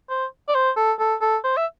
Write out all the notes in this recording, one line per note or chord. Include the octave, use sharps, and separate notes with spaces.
C5
D5
C5
A4
A4
A4
C5
E5